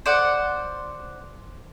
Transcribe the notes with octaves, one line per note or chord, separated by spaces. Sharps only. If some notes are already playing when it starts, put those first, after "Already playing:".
C5 D5 F#5